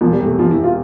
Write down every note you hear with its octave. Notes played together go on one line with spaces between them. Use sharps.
E1 F3
G3
C3
A3
E1 F3
E4
E2
F4